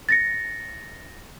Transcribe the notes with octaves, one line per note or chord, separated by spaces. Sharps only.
A6 A#6 C#7